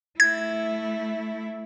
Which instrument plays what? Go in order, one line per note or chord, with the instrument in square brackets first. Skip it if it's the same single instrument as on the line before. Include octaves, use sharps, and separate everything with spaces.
[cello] A3 E4 [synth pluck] G#6